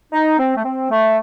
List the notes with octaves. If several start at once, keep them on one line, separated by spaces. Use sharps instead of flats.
D#4
C4
A3
C4
A3